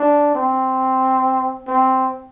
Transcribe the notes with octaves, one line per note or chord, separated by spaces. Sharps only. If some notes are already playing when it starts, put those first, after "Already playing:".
Already playing: D4
C4
C4